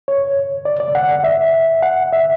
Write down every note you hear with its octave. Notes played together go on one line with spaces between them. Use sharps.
C#5
D5
D5
F#5
E5
F#5
E5